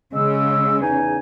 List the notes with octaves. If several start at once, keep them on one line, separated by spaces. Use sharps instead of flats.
C#3 G#3 E6
E2 D#4 G#5